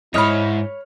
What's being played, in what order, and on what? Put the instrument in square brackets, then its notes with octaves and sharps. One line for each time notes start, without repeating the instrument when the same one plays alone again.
[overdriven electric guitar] F2 G#2 [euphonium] E4 [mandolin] C#5 B5 [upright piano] D#5 D#6 F6